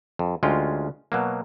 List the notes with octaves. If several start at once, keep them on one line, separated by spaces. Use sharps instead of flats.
F2
D2 G#3 C#4 F4 G5
B2 F#3 A#3